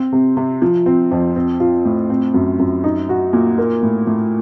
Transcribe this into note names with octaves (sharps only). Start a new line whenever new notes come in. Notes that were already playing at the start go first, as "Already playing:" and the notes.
Already playing: C4
C3
C3
F3
C4
F2
C4
F4
A2
C4
F#2
F#2
D#4
F#4
A#2
A#3
A2
A2